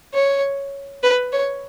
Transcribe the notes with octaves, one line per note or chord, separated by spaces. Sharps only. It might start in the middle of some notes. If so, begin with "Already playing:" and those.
C#5
B4
C#5